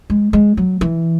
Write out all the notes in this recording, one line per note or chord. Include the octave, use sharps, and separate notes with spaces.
G#3
G#3
F#3
E3